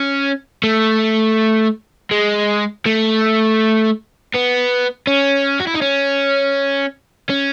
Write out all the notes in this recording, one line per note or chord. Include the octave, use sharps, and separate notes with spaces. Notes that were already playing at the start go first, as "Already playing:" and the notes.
Already playing: C#4
A3
G#3
A3
B3
C#4
F#4
E4
D#4
C#4
C#4